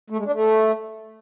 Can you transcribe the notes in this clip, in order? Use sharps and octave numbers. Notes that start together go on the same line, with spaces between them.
A3
G#3
D4
A3